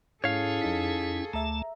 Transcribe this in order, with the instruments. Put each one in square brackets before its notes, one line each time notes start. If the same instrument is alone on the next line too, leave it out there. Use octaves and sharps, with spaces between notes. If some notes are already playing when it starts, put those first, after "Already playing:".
[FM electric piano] G#2 [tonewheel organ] C#4 E4 [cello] G#4 A4 [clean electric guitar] C#5 F5
[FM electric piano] F2 D#4 B6
[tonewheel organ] D2 A3 A5 [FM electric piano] E5 A#5